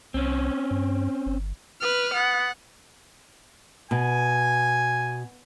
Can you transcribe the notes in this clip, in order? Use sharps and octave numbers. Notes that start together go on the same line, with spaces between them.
C2 C4 C#4
G2
G1
B4 F6
B3 F#5
B2 G#5